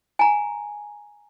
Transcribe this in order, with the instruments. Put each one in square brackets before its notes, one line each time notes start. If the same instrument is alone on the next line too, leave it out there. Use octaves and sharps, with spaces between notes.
[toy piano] G#5 A#5